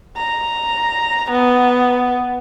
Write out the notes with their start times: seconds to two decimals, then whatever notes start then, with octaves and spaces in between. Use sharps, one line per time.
0.17 A#5
1.31 B3